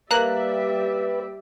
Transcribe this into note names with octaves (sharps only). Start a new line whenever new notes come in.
G3 A#3 B4 D5 E5 A#5 F#6